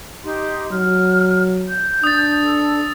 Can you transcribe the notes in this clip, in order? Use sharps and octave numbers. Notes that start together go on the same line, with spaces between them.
D#4 G4 C6
F#3 F6
G6
D4 D#6 A6
A4